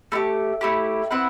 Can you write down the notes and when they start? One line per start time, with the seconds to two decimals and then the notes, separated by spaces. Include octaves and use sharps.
0.12 A3 E4 G4
0.61 A3 E4 G4
1.11 C4 E4 B4 F#5